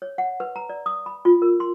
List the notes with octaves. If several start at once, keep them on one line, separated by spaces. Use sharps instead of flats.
C#5
F#5
B4
A#5
D5
D#6
B5
F4
A#4
C6